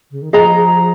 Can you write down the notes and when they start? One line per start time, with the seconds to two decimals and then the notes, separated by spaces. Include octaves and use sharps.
0.11 C#3
0.22 D#3
0.32 F3 G#4 D#5 A#5